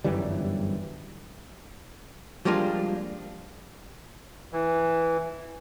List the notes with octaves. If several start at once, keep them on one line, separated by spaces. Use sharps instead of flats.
G1 F#2 E3 G3
F3 G3 G#3 A#3 D4 F4
E3